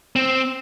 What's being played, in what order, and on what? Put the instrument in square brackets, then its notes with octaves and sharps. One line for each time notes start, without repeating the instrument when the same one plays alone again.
[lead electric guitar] C4